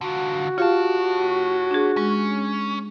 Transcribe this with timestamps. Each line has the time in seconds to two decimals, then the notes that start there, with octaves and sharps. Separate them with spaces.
0.01 D3 F4 F#4
0.58 F4 G4 C#5 F5 A5
1.71 D4 G#4
1.97 G#3 C#4